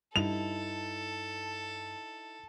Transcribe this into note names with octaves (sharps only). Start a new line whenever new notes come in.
G2 D#4 E4 A4 F7